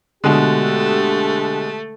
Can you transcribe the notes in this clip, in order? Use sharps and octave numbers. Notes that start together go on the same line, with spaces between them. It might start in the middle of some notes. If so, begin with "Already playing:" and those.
B2 D3 G#3 A3 G4